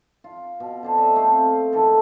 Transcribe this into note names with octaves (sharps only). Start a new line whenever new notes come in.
F4
B2
D3 D4 C5
D#5 E5 G#5
A3 C4 F4 F5
D#3 E3 D#4 A4